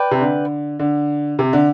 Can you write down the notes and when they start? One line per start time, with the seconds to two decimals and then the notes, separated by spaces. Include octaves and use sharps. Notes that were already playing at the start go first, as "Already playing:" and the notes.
Already playing: B4 D5 G5
0.11 C3
0.21 D3
0.79 D3
1.39 C3
1.53 D3